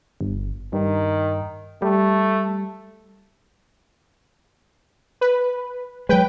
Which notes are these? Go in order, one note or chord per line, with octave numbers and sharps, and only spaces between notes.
G1
G2 D#3
G3 A3
B4
F#3 G#3 B4 G5